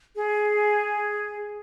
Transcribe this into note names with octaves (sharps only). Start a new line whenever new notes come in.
G#4